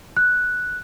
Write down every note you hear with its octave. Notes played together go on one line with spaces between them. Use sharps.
F#6